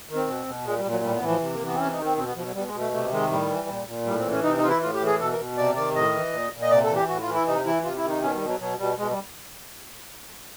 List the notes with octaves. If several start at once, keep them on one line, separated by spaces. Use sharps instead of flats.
D#3
C4
B2
B2
A#2 G#3
G3
A#2
F#3
A2 G3
B3
E3
F3
C3
A#3
E3
B3
C4
C3 C#4
D#4
D#3
C4
B2 C4
B3
B2 F3
F#3
B2 G3
G#3
B2
A3
C3 A3
D#3 G#3
A2 G3
E3
A#2
A#2
A2 G3
C4
E3
C#4
C3 D#4
D#4
E3 F4
E4
A2 F4
G4
E3
G#4
B2 A4
A#4
B2
C3 D5
D#3 D5
A2 D#5
E3
A#2
A#2
D#5
C3 D5
A4
E3
G4
A2 F#4
F4
E3
E4
C3 D#4
E3 E4
C3 F4
E4
D#3
D#4
B2 C#4
G3
B2
F#3
B2 F#3
B2 G3
B2 G#3
G3